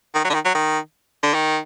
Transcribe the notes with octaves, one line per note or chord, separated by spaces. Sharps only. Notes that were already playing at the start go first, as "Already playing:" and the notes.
D#3
F#3
D3
D#3
F#3
D#3
D3
D#3